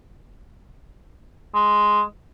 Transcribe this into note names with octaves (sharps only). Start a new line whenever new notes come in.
G#3